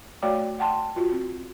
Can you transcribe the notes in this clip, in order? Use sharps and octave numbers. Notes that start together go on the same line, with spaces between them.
A3 F#4 C#5 D5 G5 D6
F#5 G5 A5 C6
F4 F#4
C4